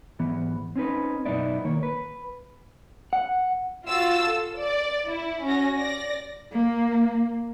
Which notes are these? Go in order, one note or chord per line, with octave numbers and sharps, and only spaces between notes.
G#2 E3 B3
C4 C#4 D#4 B4
B1 F#2 B3 D#4 E4 D5
D#3 A#3 C#5
B4
F#5
F4 F#4 E6 A6
A4
D5
E4
C#4 F#4 A#6
D5 A#6
A#3